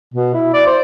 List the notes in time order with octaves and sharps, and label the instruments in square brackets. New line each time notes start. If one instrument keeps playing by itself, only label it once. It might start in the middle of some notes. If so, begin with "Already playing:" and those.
[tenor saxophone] B2
E4
D5
C5